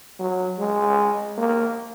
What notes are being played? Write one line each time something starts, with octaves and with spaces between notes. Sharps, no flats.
F#3
G#3
A#3